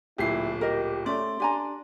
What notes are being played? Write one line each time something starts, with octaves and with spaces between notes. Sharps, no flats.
D1 A#2 E4 G4 C7
G4 A#4 D#5
A3 C#4 D5 C6
D4 G4 G#5 A#5